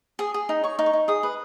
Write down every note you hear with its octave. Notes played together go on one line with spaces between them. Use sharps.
G#4 D#6
G#4
D#4
C#5 C#6
D#4
C#6
D#4
G#4 D#6
B4